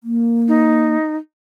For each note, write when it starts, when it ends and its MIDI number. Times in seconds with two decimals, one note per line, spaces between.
0.04 0.96 58
0.48 1.16 63